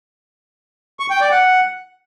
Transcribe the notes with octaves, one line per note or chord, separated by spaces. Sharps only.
C#6
G5
D5
F#5